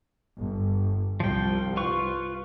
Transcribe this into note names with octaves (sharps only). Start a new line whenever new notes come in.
G1
C2 F3 G3 G5
F4 B4 C#6